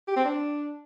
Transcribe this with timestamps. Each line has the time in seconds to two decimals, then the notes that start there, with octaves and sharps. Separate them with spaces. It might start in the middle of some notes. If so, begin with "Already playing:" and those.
0.08 G4
0.16 C4
0.25 D4